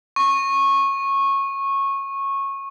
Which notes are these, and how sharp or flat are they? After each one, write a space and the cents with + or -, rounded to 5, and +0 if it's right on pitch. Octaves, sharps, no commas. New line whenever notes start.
C#6 -15